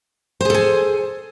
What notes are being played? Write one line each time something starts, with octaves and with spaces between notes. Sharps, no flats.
G#4 A4 C5 G#5